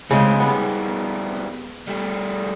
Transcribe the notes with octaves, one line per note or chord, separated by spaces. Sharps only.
A2 C#3 G#3 C4 G5
B2 G3 B3
G3 A3